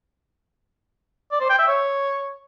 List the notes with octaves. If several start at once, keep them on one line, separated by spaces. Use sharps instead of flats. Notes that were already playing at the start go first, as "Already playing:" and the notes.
D5
C5
G5
E5
C#5